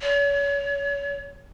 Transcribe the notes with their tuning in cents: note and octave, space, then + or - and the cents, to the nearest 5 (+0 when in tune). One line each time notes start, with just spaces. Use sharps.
C#5 +35